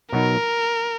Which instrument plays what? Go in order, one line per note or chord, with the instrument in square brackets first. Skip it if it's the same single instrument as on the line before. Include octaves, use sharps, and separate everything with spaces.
[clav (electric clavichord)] B2 F#3 B3 D#4 [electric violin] A#4